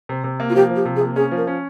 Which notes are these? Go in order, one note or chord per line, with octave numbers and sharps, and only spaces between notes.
C3
C3
A#3
F4
F3 G4
F3
G4
C3
G#4
A#3
C#4 G#4
F3
A#4
C#4